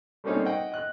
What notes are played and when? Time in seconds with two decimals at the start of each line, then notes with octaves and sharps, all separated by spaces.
0.24 G3 A3 A#3 C4 C#4 D#4
0.46 D#5 F#5 G5
0.72 D#5 F#6